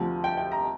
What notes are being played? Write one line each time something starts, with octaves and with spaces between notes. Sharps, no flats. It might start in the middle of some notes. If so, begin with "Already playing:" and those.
Already playing: D2 C3 F3
G5
G5
A#5